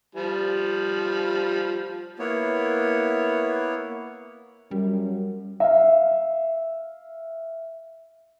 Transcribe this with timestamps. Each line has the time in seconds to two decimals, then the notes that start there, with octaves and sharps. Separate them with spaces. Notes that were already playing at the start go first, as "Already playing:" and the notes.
0.15 F3 G3
2.19 A#3 B3 E4 C#5
4.71 F#2 G3
5.60 E5 F5